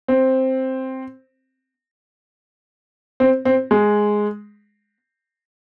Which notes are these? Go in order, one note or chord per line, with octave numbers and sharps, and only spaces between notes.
C4
C4
C4
G#3